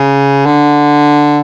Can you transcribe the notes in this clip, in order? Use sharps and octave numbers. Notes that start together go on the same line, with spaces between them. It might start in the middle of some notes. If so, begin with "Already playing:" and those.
Already playing: C#3
D3